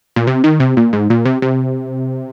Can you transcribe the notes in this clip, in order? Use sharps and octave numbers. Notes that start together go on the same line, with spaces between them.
A#2
C3
D#3
C3
A#2
G#2
A#2
C3
C3